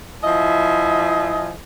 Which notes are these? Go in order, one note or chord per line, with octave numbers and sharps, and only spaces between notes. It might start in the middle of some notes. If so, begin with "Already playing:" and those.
F3 E4 D#5 E5 G#5